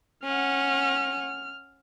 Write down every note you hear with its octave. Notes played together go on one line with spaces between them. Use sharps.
C#4 F#5 F6